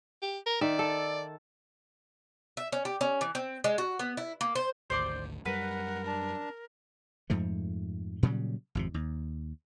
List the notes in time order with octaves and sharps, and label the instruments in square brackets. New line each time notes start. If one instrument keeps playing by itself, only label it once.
[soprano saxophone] G4
A#4
[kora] D#3 E5 [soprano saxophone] D5
[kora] A4
[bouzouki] E5
C#4
G4
C#4
E3
C4
G#3
F#4
B3
E4
A#3
C5
[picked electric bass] G#1 D2 [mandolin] C5 D5 D6
[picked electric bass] F#2 G3 [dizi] A#4 [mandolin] B4 [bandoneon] F#5
[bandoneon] D4 A5
[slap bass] F2 G#2 F3 A3
A#2 C#3 F#3 G3
G#1 F2 C3
D#2